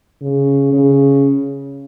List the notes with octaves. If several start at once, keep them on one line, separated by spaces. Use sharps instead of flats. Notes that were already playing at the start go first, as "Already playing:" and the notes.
C#3
C#3